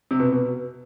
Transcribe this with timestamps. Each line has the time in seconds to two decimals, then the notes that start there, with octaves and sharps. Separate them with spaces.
0.11 C3
0.20 B2
0.32 B2